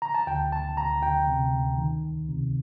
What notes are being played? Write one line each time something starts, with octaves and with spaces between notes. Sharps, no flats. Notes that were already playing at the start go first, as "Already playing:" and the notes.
A#5
A5
D2 G5
D2 A5
D2 A#5
D2 G5
C3
D2
D#3
C2
C3